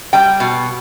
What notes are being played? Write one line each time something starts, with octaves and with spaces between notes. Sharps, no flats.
G3 G5
B2